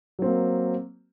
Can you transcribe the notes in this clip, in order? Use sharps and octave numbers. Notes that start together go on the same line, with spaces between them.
F#3 A#3 C4